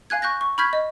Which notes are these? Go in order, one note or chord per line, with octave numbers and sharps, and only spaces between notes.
F5 G#5 F#6 G#6
C#6 F#6 G6 A#6
C#6
B5 C#6 F6 G6 G#6 B6
D#5